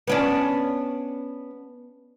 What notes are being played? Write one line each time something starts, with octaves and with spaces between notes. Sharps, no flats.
B3 C#4 D4